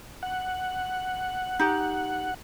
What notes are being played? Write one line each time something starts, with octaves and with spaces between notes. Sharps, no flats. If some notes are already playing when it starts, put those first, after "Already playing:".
F#5
D#4 G4